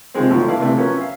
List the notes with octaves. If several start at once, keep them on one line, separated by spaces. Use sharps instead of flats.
C3 D#3 F3 G#3 C4
A#2 D3 D#3 F3 F#3 A3
B3 E4 D5 F5 A5
C3 E3 A3 B3
F3 F#3 B3 C#4 A#4
E5 F5